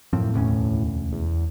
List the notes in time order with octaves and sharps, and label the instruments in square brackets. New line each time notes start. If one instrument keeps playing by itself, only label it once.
[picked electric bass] F#2 F3 C4 [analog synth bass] A2
[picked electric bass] E1 D2 C#4
[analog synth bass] E2